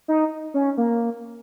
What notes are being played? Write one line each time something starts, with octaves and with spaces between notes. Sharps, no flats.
D#4
C#4
A#3